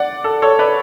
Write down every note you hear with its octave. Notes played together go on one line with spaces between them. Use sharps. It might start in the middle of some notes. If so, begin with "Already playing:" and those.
Already playing: D5 F#5
A4
A4 C#5
B4 D5